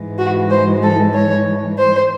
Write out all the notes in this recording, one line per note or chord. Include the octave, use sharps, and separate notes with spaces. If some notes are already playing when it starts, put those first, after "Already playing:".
Already playing: G#2 E3 G#3
F#4
C5
A4
C#5
C5